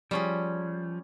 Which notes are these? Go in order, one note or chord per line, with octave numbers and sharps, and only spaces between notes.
F3 G3 C#4 G#4